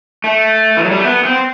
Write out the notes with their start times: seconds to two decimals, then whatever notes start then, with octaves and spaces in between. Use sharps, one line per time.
0.24 A3
0.77 E3
0.84 F#3
0.91 G3
0.98 A3
1.05 B3
1.25 C4